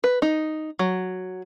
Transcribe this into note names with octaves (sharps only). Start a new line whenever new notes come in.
B4
D#4
F#3